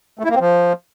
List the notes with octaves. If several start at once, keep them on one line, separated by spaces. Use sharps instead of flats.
A3
E4
A#3
C4
F3